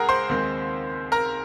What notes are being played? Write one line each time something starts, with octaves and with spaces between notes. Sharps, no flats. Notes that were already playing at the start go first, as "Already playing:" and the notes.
Already playing: C#2 G#4 A#4 F#5 A#5
C5 C6
D#2 D#3 G#3 C4
A#4 A#5